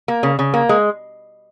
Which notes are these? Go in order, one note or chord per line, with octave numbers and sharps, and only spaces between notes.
A#3
C#3
C#3
A#3
G#3